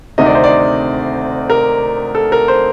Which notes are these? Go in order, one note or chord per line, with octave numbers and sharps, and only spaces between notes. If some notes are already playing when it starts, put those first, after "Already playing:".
D2 C3 D#3 D#5
D5
C5
D5
A#4
A4
A#4
C5